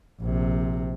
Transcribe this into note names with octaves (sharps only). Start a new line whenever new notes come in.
A#1 C3